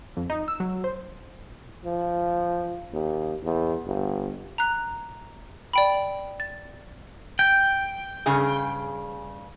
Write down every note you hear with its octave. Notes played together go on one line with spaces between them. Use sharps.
F2
D#4
E6
F#3
C5
F3
D#2
E2
G1
A#5 F#6
D5 G5 B5
A6
G5
G2 C#3 G#4